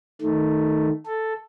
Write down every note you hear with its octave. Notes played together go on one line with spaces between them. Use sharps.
D#3 A3
A4